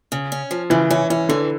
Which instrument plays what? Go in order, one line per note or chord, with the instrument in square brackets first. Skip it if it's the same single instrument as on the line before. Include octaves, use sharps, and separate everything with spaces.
[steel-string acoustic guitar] C#3
C#4
F3
[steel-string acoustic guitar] C#3 [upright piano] E3
[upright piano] E3 [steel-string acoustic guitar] C#4
[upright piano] E3 [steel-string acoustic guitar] C#4
[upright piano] D3 [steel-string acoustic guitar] E3